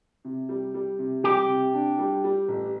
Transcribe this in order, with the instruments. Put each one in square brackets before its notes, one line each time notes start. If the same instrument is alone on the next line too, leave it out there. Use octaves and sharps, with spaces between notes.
[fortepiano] C3
G3
G3
C3
[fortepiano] G3 [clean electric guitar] G4
[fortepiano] C3
D4
G3
G3
A1